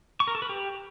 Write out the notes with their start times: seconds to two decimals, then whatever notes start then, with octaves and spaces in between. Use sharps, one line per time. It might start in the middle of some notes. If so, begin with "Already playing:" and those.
0.20 C#6
0.27 A#4
0.35 A4
0.42 B4
0.49 G4